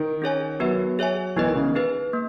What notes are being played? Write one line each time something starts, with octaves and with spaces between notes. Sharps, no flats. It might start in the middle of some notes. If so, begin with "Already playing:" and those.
Already playing: D#3
C#4 G#4 C#5 G#5
F#3 B3 F#4 B4 E5
G#4 C#5 E5 G#5
E3 B3 D#4 G#4 D#5
D#3
C#3
D#4 G#4 B4
A#3